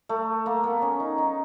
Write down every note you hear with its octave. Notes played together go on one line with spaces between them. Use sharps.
A3
A#3
B3
C#4
D#4
D#4